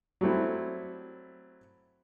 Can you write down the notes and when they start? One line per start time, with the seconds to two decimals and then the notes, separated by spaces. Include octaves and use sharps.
0.21 F#3 G3 A3 C4 E4